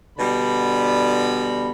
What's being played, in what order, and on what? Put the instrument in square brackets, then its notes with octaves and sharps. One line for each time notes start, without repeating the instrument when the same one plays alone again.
[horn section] B2 D3 G3 D4 B5